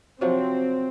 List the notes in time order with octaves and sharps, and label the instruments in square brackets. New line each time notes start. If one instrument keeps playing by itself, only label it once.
[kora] C3 F3 F#3 [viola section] C4